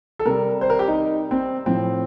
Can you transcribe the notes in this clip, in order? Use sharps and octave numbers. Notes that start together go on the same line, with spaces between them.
A4
C3 G3 A#4
C5
A#4
G4
D#4
C4
A2 F3 C4